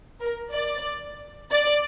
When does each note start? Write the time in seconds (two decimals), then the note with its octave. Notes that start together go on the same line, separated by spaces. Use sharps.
0.20 A#4
0.53 D5
1.51 D5